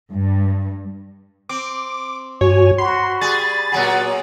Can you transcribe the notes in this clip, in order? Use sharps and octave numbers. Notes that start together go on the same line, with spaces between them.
G2
C4 D6
G2 F#4 C#5 G#5
F#4 B5 C6
G3 G#4 A6
A#2 F#3 G#4 F#5